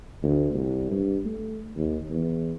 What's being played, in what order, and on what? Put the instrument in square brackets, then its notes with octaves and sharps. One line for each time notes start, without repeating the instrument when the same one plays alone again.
[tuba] D2
C2
G2
A3
D#2
E2